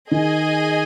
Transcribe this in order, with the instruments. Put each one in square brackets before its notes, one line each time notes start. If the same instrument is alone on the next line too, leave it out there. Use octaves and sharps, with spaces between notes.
[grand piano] D#3 [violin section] G#4 D#5 G#5